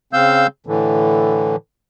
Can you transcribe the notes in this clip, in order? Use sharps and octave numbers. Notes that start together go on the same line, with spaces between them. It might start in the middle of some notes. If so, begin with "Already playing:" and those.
C#3 C4 F5 E6 G6
A2 D3 E3